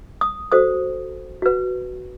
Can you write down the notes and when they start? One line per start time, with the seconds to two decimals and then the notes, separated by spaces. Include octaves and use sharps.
0.21 D#6
0.52 F#4 A4 C5 D#6
1.42 F#4 B4